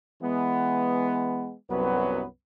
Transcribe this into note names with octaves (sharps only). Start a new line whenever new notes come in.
E3 G#3 B3
C2 F#2 F#3 B3 B4